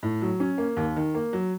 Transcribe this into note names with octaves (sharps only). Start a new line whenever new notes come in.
A2
F#3
C#4
A#3
D#2
D#3
A#3
F#3